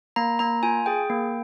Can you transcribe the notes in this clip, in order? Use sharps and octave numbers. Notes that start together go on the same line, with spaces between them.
A#3 A#5
A#3 A#5
F4 G#5
G#4 G5
A#3